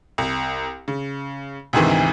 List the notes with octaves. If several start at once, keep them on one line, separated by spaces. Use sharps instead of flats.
C2
C#3
D2 G#2 C3 D#3 E3